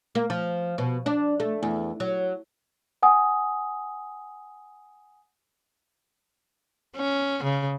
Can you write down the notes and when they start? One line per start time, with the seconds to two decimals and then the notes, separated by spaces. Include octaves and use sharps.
0.15 A#3
0.30 F3
0.78 B2
1.06 D4
1.40 A3
1.63 E2
2.00 F#3
3.03 F#5 G#5 D#6
6.96 C#4
7.44 C#3